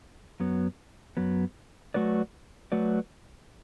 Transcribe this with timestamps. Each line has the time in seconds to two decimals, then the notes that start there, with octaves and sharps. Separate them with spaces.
0.40 F#2 F#3 B3
1.17 F#2 F#3 B3
1.94 F#3 A3 F#4 B4 D5
2.72 F#3 A3 F#4 B4 D5